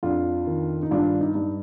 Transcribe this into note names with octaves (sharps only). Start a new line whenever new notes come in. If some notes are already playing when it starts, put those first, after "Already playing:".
F2 D4 F4
D#3
D#4
G2 D4 F4
D#4
G2